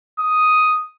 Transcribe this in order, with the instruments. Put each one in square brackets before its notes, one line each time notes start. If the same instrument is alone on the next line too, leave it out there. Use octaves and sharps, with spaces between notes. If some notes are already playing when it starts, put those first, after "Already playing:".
[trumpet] D#6